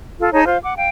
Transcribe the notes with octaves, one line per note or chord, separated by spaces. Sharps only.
F4 A4
D#4 G#4 C#5 A5
F4 C5 F5
F#5 D6
F5 G5